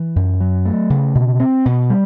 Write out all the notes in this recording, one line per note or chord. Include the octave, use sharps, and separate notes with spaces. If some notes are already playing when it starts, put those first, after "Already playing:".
Already playing: E3
F#2
F#3
A3
C#3
B2
C4
B2
G3